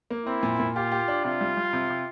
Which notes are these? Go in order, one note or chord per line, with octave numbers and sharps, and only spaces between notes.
A#3
C4 E4
A#2
A#2
F4 G4
G4
D4
C3 F4
G3
G3
C3
C3